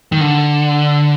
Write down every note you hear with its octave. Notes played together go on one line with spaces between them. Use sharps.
D#3
D3